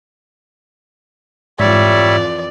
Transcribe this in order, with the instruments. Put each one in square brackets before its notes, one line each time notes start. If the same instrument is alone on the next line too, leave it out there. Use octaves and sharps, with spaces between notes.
[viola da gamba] F2 E3 F3 [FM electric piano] G#2 [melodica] G3 C#5 E5 [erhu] D5